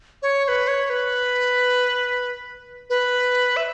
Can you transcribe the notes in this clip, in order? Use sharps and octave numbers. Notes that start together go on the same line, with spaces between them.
C#5
C#5
B4
C#5
B4
B4
E5